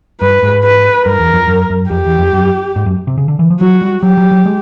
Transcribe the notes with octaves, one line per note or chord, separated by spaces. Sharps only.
G2 B4
G#2
B4
G2 A#4
E2
F2
F#2
F#2
F2 G4
E2
F2
F#2
G#2
F#2
C3
C#3
D3
E3
F3
F#3 F#4
G3
F#3 G4
F#3
F#3
G#3